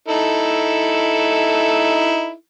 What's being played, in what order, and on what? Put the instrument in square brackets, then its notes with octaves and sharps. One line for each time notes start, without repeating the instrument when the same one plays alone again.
[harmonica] D#4 E4 A4